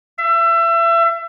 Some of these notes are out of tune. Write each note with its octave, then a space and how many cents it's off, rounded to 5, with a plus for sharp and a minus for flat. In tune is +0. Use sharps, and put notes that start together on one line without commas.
E5 +30